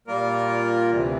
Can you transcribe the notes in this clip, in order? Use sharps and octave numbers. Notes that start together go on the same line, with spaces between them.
A#2 G3 A#3 F4 A#4
D2 C3 E3